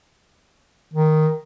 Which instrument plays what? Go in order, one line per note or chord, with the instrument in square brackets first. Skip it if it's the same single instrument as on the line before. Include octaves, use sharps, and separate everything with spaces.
[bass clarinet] D#3